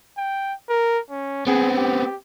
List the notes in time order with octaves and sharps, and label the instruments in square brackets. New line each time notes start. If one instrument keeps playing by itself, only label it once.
[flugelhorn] G5
A#4
C#4
[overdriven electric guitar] B3 C4 [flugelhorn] G#4
[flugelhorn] G4